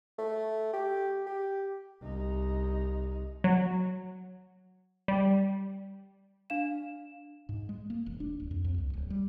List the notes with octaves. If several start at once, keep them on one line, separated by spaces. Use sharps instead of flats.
A3
G4
G4
C2 D#4
F#3
G3
D4 F5 E7
G#2
G#3
A#3
E1
D4
D1
F2
F2
C#2
D1
G3